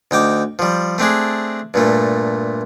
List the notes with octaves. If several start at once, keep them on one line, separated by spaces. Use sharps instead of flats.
D2 D#4 G5 D6
F3 G3
A3 C4 D4 G#4
G2 A#2 A3